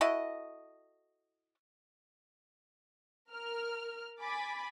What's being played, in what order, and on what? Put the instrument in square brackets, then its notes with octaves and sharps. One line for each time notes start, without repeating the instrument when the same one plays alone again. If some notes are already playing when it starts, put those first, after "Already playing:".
[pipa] E4 F#4 A4 D#5
[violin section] A#4 F6
G#5 B5 D6 A6 B6